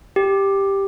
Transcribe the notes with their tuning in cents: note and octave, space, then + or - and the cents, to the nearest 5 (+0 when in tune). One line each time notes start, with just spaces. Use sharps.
G4 +5